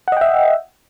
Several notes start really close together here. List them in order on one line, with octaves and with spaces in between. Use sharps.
F#5 D#5 G5 E5